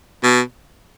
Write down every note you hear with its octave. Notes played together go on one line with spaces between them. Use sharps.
B2